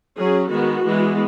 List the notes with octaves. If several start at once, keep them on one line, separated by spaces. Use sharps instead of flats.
F#3 C#4 G#4
D#3 G#3 B3 F#4
E3 G#3 B3